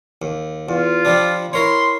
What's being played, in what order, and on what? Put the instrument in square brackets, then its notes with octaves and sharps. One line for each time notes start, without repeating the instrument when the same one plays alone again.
[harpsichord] D#2
[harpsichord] E2 [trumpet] F4
[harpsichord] F3 G3 D4
[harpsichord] E4 A#4 C#5 [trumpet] C6